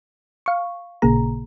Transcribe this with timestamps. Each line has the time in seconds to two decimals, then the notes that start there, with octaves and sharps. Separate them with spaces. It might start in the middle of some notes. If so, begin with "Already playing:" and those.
0.46 F5 C#6
1.02 A1 A#2 C#3 A#3 G#4 A#5